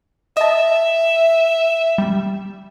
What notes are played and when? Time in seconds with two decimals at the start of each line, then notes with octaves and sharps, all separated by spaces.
0.37 D#5 E5 A5
1.98 G3